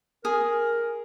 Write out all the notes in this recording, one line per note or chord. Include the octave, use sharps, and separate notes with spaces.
G#4 A#4